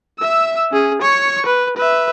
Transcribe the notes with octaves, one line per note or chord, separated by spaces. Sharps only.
E5 E6
C#4 G#4
C#5 C#6
B4
B4 E5